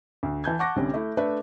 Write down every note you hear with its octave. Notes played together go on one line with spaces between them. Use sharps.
D2
E3 A5 G6 G#6
F#5 A5 C#6 D6 F#6 A#6
C2 D3 G3 C#4
A3 E4
A3 D4 A4 B4 D5 E5